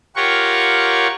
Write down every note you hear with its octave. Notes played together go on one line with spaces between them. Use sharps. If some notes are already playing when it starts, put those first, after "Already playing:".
F4 G4 A#4 C#5 F#5 C#6